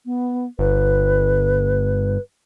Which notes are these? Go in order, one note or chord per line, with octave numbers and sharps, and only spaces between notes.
B3
G1 B4